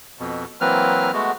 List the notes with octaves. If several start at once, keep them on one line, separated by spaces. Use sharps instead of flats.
F2 B2
E3 F#3 A#3 C4 B4 F6
G#3 A3 B3 F#4